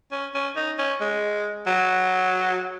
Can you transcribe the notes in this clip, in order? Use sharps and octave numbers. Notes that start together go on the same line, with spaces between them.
C#4
C#4
D#4
C#4
G#3
F#3